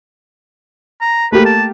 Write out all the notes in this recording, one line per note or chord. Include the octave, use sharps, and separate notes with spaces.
A#5
A3 A#3 G4 B4
A5